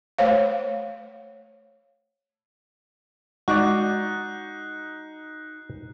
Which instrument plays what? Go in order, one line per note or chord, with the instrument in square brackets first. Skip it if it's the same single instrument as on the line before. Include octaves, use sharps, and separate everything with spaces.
[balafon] A3 C5 C#5 F5
[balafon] G#3 D#5 [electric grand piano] D#4 [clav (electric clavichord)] F#4 D5 [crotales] F#6 C7